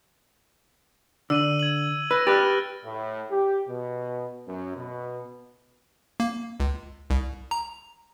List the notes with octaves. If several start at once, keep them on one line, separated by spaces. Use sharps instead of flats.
D3 E6 D#7 F#7
G#6 F#7
B4 E6 A#6
G4 B4 F6 F#6 A6
A2
G4
B2
F#2
B2
A#3
C#2
C2
A#5